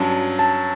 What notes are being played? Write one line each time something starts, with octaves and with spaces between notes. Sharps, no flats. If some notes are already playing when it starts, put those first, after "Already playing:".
Already playing: G2 F#3 C#4 A5
A5